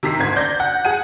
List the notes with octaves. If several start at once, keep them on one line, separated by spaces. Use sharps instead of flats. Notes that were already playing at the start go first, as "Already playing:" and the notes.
C3 D#3 A#5 B6 C7
F#1 D2 G#6
D5 G6 A#6
F#5
G#4 F#5 D#7